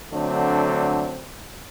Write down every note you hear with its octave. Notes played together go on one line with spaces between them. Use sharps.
D3 F#3 A3 C4 D4